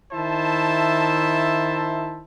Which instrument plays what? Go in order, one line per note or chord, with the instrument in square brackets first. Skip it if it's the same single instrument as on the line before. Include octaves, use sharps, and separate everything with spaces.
[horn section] D#3 E4 C5 E5 A5